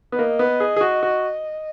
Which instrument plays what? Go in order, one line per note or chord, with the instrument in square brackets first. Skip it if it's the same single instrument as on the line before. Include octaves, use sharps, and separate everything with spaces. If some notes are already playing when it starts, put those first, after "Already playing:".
[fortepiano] B3
[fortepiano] A#3 [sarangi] D#5
[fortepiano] B3
G#4
G#4
F#4
F#4